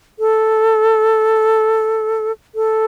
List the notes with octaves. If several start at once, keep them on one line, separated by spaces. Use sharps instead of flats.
A4
A4